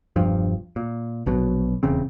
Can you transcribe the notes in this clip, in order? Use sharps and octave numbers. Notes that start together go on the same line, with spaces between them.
E1 G2 F3
A#2
A#1 B2 F#3
D#1 E2 C#3 C4